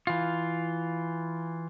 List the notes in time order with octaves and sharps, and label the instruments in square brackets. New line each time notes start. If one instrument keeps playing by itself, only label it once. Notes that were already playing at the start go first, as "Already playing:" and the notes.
[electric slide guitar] E3 F4